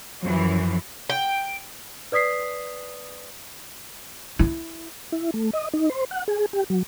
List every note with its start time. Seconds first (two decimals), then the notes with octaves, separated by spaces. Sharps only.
0.22 F#2 E3 F3
1.10 G5
2.12 B4 D5 D#6 B6 C7
4.39 E4
5.12 E4
5.34 A3
5.53 D#5
5.73 D#4
5.90 C5
6.11 F#5
6.28 G#4
6.53 G4
6.70 F#3